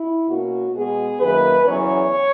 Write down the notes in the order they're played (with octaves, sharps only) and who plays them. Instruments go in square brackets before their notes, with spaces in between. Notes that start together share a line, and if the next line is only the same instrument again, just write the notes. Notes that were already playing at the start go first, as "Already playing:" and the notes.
Already playing: [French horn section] E4
B2 A#3 C#4 F#4
B2 G#3 B3 G#4
F#2 D#3 A#3 B4
E2 C#3 F#3 C#4 C#5